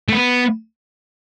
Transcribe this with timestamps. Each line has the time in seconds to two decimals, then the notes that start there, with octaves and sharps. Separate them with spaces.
0.09 A3
0.12 B3